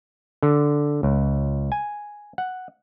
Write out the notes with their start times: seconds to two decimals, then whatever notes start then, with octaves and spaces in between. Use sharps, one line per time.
0.43 D3
1.03 C#2
1.72 G#5
2.38 F#5